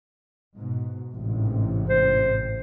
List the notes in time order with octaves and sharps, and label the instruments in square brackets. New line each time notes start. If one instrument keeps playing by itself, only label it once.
[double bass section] G#2 B2
A1 G#2 C3
[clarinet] C5